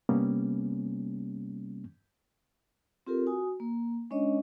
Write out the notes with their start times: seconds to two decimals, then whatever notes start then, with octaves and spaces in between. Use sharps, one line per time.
0.09 C3 G3 A#3 B3 C#4
3.07 C4 F4 G4 A4 A#4
3.27 F#4 G#5 D#6
3.60 A#3
4.11 G#3 C#4 D4 C#5 D#5